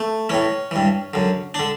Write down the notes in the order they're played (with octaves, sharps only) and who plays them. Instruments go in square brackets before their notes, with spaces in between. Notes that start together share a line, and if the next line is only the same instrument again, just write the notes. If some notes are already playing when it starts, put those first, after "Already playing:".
Already playing: [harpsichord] A3
A2 E3 C#4
G2 E3
F#2 D3
D3 D4